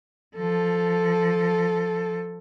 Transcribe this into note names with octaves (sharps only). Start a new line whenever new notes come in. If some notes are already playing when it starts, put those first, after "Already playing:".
F3 A4